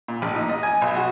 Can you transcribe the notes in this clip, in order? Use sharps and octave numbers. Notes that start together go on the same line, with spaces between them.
A#2
A1
D#4
D#5
G#5
B1
F#4